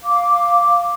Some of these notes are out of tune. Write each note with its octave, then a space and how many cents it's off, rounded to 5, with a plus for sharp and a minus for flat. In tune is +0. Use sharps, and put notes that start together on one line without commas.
F5 +0 D6 +0